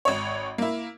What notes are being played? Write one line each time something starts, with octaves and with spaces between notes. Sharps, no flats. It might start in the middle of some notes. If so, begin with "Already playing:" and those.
G#1 C#5
A#3 E4